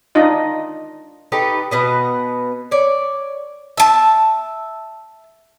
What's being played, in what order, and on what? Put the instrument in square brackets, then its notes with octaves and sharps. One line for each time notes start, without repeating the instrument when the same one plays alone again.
[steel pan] D4 D#4 F4 D#5
[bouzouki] D#4 G4 A4 B4
B2 B3 D#5
C#5 D5
E5 A5